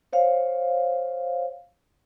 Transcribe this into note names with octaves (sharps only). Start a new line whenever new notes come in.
C5 C#5 F5